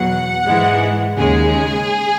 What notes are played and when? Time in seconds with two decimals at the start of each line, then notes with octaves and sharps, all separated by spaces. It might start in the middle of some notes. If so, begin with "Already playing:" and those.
Already playing: E2 B2 F#3 F#5
0.45 G#2 E3 G#3
1.18 D#2 C#3 G#3 G#4